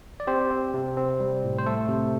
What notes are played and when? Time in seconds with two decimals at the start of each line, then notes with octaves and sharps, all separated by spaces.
0.20 D5
0.27 C4 G4 C5
0.51 C4
0.74 C3
0.97 C4
1.20 G3
1.44 A2
1.59 C5
1.66 A3 A4
1.89 C3